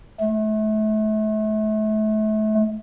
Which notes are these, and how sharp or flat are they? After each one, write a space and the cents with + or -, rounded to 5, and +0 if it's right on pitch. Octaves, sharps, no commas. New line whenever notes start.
A3 -35